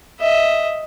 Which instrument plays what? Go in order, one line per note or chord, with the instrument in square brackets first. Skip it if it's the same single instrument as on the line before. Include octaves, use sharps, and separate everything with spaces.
[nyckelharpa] D#5 E5